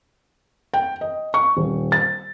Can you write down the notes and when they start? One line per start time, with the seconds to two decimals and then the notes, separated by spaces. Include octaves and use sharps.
0.74 G5
1.01 D#5
1.34 C#6
1.57 D#1
1.92 A6